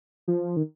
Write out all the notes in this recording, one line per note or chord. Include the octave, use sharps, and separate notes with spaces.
F3
D#3